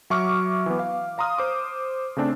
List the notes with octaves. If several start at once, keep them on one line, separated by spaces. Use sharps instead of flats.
F#3 E5 C#6 D6 F6
E3 B3
F5
F5 A#5 C6 D#6 F6
C5 D6
C#3 A3 C4 D4